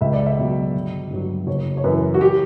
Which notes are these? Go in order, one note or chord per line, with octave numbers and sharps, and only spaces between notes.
C#2 E5
D5
E5
B2 F#3
G1
G2 F#3
F#1 C#5
C#5
F#2 E3 B4
F#4
G4